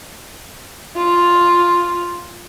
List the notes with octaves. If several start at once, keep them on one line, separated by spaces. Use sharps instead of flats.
F4